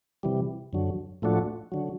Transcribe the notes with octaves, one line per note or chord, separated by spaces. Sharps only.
C3 E3 G3
F#2 D3 F#3
A2 F3 A3 D4 F#4
D3 F#3